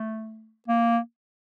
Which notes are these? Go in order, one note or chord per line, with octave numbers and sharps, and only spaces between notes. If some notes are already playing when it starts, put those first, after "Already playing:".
Already playing: A3
A#3